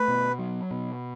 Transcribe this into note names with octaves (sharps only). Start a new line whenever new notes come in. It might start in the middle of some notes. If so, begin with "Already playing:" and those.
Already playing: A3 B4
B2
F#3
B2